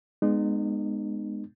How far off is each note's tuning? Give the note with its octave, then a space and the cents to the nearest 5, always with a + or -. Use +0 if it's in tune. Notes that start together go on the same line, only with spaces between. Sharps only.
G#3 +0 B3 +0 D#4 -40